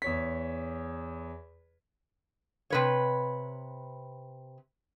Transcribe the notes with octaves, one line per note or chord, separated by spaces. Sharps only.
E2 C#5 B6
C3 B4 C#5